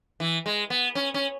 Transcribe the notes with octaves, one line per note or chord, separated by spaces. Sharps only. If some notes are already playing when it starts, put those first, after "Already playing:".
E3
G#3
B3
C#4
C#4